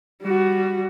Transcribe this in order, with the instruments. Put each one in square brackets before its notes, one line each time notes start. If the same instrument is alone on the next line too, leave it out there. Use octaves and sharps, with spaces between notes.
[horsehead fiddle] G3 F#4